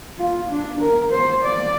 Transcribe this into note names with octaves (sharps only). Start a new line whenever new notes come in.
F4
D4
A#4
C5
D5